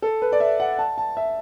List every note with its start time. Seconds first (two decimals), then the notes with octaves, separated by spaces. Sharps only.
0.02 A4
0.22 B4
0.32 D5
0.40 E5
0.60 F#5
0.79 A5
0.98 A5
1.17 E5